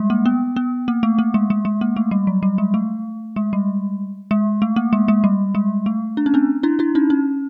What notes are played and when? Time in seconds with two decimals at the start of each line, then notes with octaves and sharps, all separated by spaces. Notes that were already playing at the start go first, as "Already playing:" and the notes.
Already playing: G3 G#3
0.10 A#3
0.26 B3
0.56 B3
0.88 A#3
1.03 A3
1.19 A#3
1.34 G#3
1.50 G#3
1.65 G#3
1.81 A#3
1.96 A3
2.11 G3
2.27 F#3
2.43 G3
2.58 G#3
2.74 A3
3.36 G#3
3.53 G3
4.31 G#3
4.62 A3
4.76 A#3
4.93 G#3
5.08 G#3
5.24 G3
5.55 G#3
5.86 A3
6.17 D4
6.26 C#4
6.34 C4 D4
6.63 D4 E4
6.79 D4 E4
6.95 C#4 D#4
7.10 C#4